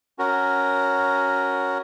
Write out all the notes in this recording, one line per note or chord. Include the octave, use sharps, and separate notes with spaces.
C#4 F#4 A#4